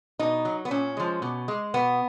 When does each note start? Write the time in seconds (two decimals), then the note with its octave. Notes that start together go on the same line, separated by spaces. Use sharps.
0.19 B2 D#4
0.45 F#3
0.65 B3
0.71 A#2 C#4
0.97 F3 G#3
1.22 B2
1.48 G#3
1.74 B2 B3